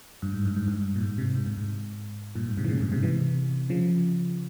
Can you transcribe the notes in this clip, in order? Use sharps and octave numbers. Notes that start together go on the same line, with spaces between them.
G2
G#2
G2
G#2
G2
A#2
G#2
G#2 C3
G#2
G#2
G#2
G2 A#2
G#2
G#2 C3
E3
A#2 C#3
G2 A#2
G#2 C3
C3 E3
C#3 F3